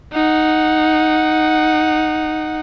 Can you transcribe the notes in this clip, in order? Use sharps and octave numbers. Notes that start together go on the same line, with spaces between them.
D#4 F#5